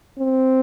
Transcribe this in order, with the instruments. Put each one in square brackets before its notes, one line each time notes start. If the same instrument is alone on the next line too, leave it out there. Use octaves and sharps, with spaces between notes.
[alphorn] C4